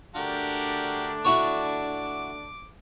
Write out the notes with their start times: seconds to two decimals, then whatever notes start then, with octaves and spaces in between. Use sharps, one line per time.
0.15 D3 A3 D4 F#4 G4 A#4
1.25 E4 F#4 C#5 D6